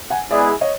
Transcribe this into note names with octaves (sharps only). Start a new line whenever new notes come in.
F#5 G#5
G#3 B3 E4 G#4 D5 E5
C#5 D#5